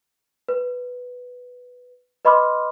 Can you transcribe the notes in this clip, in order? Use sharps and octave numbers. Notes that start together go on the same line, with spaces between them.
B4
B4 D#5 B5 C6 D6 F6